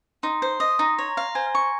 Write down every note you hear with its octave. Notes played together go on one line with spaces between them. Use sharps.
D#4 C6
C5
D#5
D#4 A#5 A#6
C#5
F5
C5 G#5 G#6
C#6